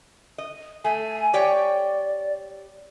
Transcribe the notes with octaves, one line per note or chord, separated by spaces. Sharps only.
D#5
A3 G#5
G4 C#5 D5 G5